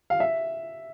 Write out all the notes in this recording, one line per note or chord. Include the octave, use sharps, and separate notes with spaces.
F5
E5